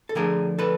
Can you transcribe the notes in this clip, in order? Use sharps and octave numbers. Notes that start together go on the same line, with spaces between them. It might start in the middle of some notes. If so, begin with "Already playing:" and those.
A4
D3 F3 A3 D4 G#4 A#4
A4 B4